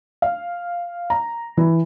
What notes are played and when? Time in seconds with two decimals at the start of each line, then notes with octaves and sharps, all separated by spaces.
0.22 F5
1.10 A#5
1.57 E3